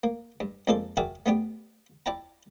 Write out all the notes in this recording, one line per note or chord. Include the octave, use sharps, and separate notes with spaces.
A#3
G2
F2 G#3 A#3 A4 D5 C6
F#4 G#4 A#4 D5 E5 G5
A3 B3 D4 G4
E4 D5 G5 A5 A#5